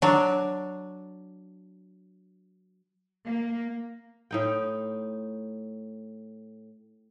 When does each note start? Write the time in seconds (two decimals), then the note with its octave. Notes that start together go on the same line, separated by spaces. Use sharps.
0.02 F#3 D4
3.26 A#3
4.31 A2 D#4 G5